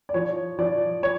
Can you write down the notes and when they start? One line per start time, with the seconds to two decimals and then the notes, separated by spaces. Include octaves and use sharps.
0.09 D5
0.14 F3 C#5
0.59 F3 D5
1.03 C#5